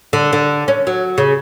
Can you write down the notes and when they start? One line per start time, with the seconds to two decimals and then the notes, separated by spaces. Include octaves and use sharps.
0.13 D3
0.33 D3
0.68 C#4
0.87 F#3
1.18 C#3